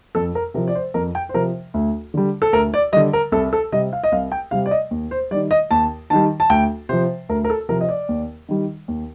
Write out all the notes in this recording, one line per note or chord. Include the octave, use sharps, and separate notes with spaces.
F2 A4
A#4
C3 F3 A#4
D5
C5
F2 A#4
G5
C5
C3 F3 A#4
D2
D3 G3
A4
D2 A#4
D5
D3 G3 D#5
A#4
C2 A4
A4
C3 G3 D#5
F5
D#5
C2 F5
G5
C3 G3 F5
D5
D#5
D#2
C5
D#3 G3 D5
D#5
D#2 A5
D#3 G3 A5
A5
D2 G5
C3 F3 C5
D2 A#4
A#4
A4
C3 F3 A#4
D#5
D5
D#2
D#3 G3
D#2